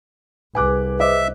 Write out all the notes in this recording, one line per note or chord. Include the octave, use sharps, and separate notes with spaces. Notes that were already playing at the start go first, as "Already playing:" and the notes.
C2 G#4 B4 G#5 D6 F#6
C5 D#5 E5 D6